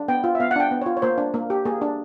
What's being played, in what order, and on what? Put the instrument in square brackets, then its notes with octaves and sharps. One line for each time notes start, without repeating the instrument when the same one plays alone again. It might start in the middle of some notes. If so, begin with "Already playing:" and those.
Already playing: [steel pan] D4
B3 G5
F4
E5
B3 F5
F#5
D4 G5
B3
C#5
F4
C#5
A#3 C5
D4
A#3
G4
A#3 G#4
D4